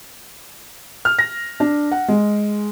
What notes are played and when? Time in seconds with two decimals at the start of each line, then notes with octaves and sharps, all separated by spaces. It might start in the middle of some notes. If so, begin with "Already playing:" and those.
1.05 F6
1.19 A#6
1.60 D4
1.91 F#5
2.08 G#3